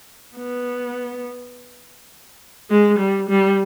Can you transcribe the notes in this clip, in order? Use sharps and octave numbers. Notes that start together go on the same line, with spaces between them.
B3
G#3
G3
G3